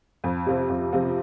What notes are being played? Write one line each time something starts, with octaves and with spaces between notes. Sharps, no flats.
F2
C3 F3 C4 F4
F2
C3 F3 C4 F4